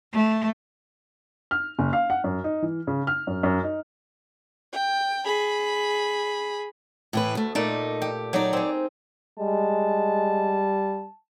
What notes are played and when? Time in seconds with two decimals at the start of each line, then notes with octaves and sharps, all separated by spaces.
0.12 A3
1.51 F6
1.79 F#1
1.93 F5
2.10 F#5
2.24 F#2
2.44 D#4
2.62 E3
2.87 C#3
3.07 F6
3.27 F#2
3.43 F#2
3.63 D#4
4.73 G5
5.25 G#4 B5
7.13 A2 E3 B4
7.35 D2 A3
7.55 A#2 A3 D#4 D5
8.02 G4
8.33 F#3 D#4 C#5 D5
8.53 C4 G#4
9.40 G3 G#3 A5